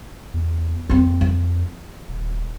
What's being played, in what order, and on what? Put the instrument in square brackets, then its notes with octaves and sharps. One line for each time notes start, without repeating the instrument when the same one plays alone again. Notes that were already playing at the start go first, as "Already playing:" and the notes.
[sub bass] E2
[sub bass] F2 [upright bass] A#3 C4
[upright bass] F3
[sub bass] D#1